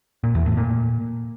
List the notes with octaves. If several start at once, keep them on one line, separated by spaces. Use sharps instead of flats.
A#2
E2
A2
A#2